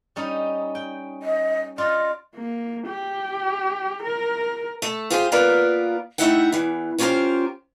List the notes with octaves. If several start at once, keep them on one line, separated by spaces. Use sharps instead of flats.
G3 C#4 D#4
G5
D#5
F4 D5 D#5
A#3
G4
A#4
A3 A4
F4 G4 G#4 C5
A#3 B3 F4 A#4 B4 D5
A3 D#4 E4 E5 F#5 G5
E2 E3
B3 C#4 F4 G4 A#4 C5